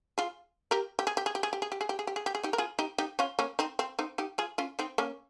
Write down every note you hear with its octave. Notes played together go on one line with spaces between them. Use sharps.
F4 G#4
G4 A#4
G4
G#4
G4
G#4
G4
G#4
G4
G#4
G4
G#4
G4
G#4
G4
G#4
G4
G#4
D#4 G4
A#4
F4 G#4
D#4 G4
D#4 G4
C#4 F4
A#3 C#4
C4 D#4
C4
C4 D#4
D#4 G4
F4 G#4
C#4 F4
C4 D#4
A#3 C#4